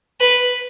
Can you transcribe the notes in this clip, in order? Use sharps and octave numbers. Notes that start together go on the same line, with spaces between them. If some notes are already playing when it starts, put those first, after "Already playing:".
B4